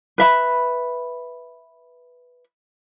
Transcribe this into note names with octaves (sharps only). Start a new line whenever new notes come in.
B4 E5 B5